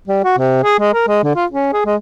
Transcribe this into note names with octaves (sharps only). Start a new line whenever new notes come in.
G3
F#4
C3
G#4
G#3
A#4
G#3
D3
F4
C#4
G#4
G#3